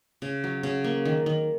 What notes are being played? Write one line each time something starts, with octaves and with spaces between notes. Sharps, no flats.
C#3
F#3
C#3
A#3
D#3
D#3